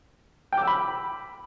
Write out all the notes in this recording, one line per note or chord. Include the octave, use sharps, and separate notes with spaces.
G5 B5 D6 E6